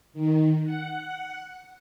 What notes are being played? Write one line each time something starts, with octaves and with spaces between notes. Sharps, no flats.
D#3
F#5